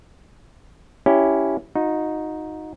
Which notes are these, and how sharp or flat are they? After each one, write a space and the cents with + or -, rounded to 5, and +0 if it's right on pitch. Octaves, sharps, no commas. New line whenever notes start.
C#4 +10 E4 +0 G4 +0
D#4 +0 F#4 -40